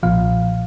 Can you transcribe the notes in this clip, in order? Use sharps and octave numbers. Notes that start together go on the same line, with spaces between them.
B1 A#2 F3 F5